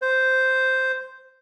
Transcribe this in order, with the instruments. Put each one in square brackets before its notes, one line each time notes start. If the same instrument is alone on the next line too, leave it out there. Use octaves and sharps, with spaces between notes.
[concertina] C5